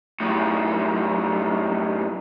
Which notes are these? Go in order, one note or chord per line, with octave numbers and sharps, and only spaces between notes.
F#2 A2